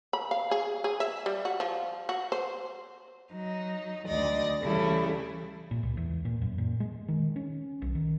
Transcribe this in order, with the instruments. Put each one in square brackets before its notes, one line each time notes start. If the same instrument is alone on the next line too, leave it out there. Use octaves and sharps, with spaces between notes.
[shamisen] B5
F5
G#4
G#4
E5
G3
F#4
F3
F#4
C5
[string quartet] F#3 D#4
D2 D5 D#5
C#3 E3 G3 A3 E4
[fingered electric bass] A#2
C#2
E2
A#2
F#2
A#2
G#3
D#3
C#4
B1
D#3